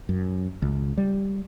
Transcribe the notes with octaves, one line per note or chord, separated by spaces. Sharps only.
F#2
C#2
G3